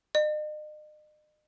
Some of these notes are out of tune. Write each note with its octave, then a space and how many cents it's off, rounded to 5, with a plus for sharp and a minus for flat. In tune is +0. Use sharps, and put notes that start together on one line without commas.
D#5 -40